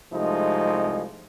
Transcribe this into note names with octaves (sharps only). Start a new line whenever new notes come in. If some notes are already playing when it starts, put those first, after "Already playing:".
C2 C3 F3 G#3 A3 D#4